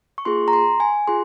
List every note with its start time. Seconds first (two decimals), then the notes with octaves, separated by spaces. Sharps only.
0.18 C#6
0.25 A#3 F4 G#4 C6
0.48 A#5
0.53 C6
0.80 G#5
1.08 F4 G#4 C6